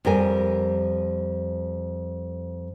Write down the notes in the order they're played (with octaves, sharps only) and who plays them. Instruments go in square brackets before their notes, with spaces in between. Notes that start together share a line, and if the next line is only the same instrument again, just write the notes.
[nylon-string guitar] F2 G3 A#4 G#5